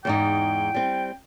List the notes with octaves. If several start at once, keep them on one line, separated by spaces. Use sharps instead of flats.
E2 G#2 D#4 G5
G3 C4